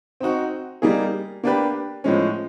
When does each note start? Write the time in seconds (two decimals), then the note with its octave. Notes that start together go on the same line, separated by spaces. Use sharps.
0.20 C4 D#4 F#4
0.82 G3 A#3 D#4 G#4
1.44 A#3 D4 G4 B4
2.04 A2 F3 G#3 C#4